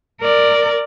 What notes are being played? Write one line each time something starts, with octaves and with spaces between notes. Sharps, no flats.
A#4 D5